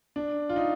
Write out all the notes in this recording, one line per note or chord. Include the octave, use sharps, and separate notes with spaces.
D4
F4
D#4